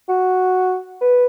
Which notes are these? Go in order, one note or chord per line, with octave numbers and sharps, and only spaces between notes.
F#4
B4